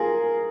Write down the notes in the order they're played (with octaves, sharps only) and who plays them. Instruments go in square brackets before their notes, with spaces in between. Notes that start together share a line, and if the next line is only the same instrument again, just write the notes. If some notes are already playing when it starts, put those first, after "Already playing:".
Already playing: [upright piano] F4 G#4 [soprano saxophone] A#4